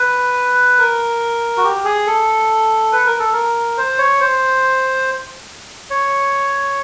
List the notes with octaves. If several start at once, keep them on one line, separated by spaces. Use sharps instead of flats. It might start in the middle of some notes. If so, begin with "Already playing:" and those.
Already playing: B4
A#4
F#4
G4
G#4
A4
B4
A#4
A4
A#4
C5
C#5
C5
C#5